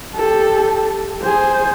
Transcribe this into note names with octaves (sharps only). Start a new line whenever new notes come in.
G4 A4
G#4 C5